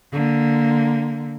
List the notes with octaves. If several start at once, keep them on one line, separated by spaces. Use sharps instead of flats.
D3 A#3